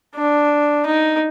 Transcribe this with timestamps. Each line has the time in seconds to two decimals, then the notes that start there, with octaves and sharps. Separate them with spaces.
0.15 D4
0.86 D#4